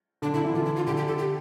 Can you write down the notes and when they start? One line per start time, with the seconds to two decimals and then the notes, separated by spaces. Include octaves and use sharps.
0.22 D3 D4
0.34 D3 E4
0.44 E3
0.54 D3 F4
0.65 E4
0.76 F4
0.87 D3 G4
0.97 G4
1.08 A4
1.18 G4